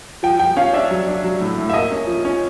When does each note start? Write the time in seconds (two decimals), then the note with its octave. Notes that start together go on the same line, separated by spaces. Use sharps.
0.23 F3 G5
0.39 F3 G5
0.57 C#4 F5
0.73 D4 E5
0.91 F#3
1.08 D4
1.24 F#3
1.41 A2
1.58 A2
1.70 E5
1.74 A#3 D#5
1.91 C#4
2.07 F3
2.25 C#4